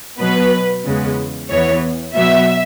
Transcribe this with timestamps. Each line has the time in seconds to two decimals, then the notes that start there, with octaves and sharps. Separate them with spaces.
0.18 B2 F#3 B3 B4
0.85 E2 C#3 G#3 B3
1.49 E2 E3 B3 C#5
2.14 B2 F#3 B3 E5